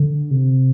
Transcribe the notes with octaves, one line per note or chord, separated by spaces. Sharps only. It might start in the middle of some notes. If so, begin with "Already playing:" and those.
Already playing: D3
C3